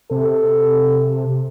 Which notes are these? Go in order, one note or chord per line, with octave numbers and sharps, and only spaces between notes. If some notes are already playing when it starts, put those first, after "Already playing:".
C3 A4